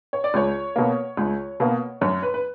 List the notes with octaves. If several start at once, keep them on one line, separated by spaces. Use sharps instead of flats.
C#5
D5
C#2 C#5
B2 A#3
C#2
B2 A#3
F#2 C#5
B4
B4